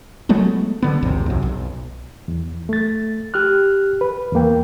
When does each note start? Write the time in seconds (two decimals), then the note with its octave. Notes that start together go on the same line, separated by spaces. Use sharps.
0.29 F#3 G#3 A3 B3
0.82 D3 B3
1.03 A#1 D#2 G#2 C3
1.26 C2 F#2
1.43 B1
2.28 E2
2.69 A3 A6
3.34 G4 F6 F#6
4.01 B4
4.32 E2 E3 A#3 G5